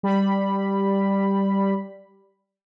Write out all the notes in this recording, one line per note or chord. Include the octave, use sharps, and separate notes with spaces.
G3 B5